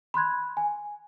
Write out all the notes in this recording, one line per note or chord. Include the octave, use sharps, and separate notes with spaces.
B5 C6 F#6 G#6
G#5